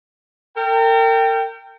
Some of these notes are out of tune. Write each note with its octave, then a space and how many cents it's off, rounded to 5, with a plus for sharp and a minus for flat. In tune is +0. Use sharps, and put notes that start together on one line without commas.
A#4 -40 G5 +0